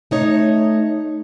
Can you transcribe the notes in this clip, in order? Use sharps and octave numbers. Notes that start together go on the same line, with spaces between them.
A3 D#4 C#5